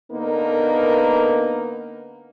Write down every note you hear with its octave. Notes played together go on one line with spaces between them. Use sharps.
D3 A#3 B3 D#4 A#4 B4